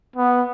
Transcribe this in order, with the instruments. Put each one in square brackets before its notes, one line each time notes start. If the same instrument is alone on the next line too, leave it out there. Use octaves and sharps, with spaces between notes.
[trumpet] B3